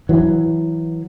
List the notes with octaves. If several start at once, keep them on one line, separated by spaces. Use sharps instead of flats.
E3 F#3